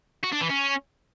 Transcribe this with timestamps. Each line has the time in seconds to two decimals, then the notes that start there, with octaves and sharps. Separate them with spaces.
0.23 F#4
0.32 D4
0.41 E3
0.49 C#4